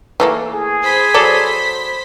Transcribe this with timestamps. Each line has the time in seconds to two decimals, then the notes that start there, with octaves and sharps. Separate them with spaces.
0.20 E3 A3 A#3
0.51 G#4
0.83 C5 B5 B6
1.14 F#3 A4 D5